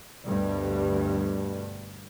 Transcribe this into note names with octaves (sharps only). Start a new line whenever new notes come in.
D2 G2 B2 G3